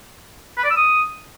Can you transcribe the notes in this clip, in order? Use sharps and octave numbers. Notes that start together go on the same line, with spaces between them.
B4
D5
E6
D#6